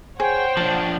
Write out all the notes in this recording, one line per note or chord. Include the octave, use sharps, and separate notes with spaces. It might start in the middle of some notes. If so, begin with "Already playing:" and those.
G#4 C5 C#5 F#5 G5
F3 D4 A5